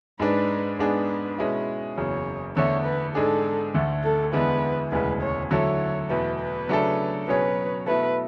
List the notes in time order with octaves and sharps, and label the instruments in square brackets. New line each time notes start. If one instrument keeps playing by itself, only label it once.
[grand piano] G#2 G#3 D4 [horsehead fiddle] B4
[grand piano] G#2 G#3 B3 D4 G#4 [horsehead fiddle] B4
[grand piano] B2 G#3 C#4 E4
[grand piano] F#1 E2 C#3 F#3 [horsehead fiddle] C#5
[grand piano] E2 D3 A3 [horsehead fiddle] C#5
[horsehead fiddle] B4
[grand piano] G#2 G#3 D4 G#4 [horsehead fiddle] A4
[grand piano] D2 D3 A3
[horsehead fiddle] A4
[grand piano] E2 D3 G#3 B3 E4 [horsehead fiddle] B4
[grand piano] E1 D2 C#3 E3 G#3 [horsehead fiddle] B4
[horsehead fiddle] C#5
[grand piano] D3 F#3 A3 E4 A4 [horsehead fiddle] C#5
[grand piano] E2 B2 A3 [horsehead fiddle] B4
[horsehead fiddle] B4
[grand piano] C#3 F#3 A3 D4 A4
[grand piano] B2 F#3 C#4 G#4 C#5 [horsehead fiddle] B4
[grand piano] B2 A3 E4 A4 [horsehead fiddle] B4